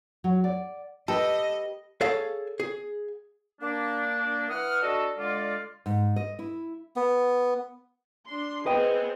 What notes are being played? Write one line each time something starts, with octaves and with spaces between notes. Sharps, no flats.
F#3
D5
G4 A4 B4 D#5
G#4 A4 C#5 F5
G#4
A#3 D4
E3 F#5 D#6 F6
D4 F#4 A4 D#5
D3 G#3 F4 D5
G#2
D#5
E4
B3
D4 C6
B3 C4 G#4 B4 D#5 G5